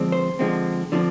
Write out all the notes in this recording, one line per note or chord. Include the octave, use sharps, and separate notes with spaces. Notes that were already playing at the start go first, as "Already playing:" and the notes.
Already playing: D3 F3 G#3 C4
C5
D3 F3 G#3 C4
D3 F3 C4